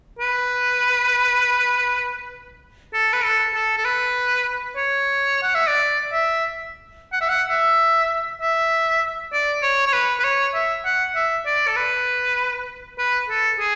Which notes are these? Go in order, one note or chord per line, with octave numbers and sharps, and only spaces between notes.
B4
A4
B4
A4
A4
A4
B4
C#5
F#5
E5
D5
E5
F#5
E5
F#5
E5
E5
D5
C#5
C#5
B4
B4
C#5
E5
F#5
E5
D5
A4
B4
B4
A4
G#4